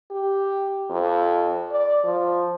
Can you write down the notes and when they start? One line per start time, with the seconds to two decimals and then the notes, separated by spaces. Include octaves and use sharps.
0.11 G4
0.90 F2
1.71 D5
2.04 F3